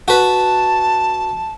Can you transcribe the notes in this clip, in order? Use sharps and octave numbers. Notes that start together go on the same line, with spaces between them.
F#4 B4 A5